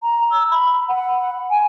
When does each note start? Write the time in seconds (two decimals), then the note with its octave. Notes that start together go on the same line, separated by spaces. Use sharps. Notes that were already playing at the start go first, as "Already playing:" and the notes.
0.03 A#5
0.31 E6
0.51 B5
0.88 F#5
1.50 G#5